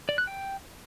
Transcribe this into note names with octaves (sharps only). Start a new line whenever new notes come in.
D5
F#6
G5